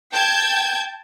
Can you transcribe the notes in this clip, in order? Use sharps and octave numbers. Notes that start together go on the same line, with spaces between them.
G5 A5 G6 G#6